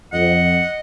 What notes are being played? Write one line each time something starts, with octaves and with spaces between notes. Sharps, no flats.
F2 D#5 F#5